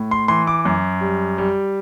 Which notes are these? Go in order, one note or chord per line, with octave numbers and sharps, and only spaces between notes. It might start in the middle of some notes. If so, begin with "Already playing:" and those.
Already playing: A2
C6
E3 C6
D6
F#2
G3
G3